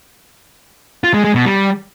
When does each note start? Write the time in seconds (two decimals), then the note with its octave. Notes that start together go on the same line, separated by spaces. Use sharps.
1.04 F4
1.14 G#3
1.24 G#3
1.35 B2
1.45 G3